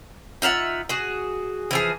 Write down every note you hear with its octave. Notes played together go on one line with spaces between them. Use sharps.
D#4 F4 E5 F#5
F#4 G#4
E3 F3 G#4